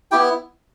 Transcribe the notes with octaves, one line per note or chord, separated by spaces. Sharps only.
B3 E4 G4 G5